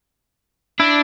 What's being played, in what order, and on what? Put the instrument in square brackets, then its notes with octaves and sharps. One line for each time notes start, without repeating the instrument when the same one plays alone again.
[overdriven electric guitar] D4 [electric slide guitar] E4